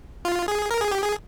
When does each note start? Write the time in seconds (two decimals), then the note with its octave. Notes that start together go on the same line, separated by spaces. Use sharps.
0.25 F4
0.48 G#4
0.71 A#4
0.81 G#4
0.91 G4
1.02 G#4